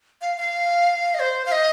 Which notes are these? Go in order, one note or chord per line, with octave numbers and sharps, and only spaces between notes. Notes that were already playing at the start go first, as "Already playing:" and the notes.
F5
F5
D#5
C5
F5
D#5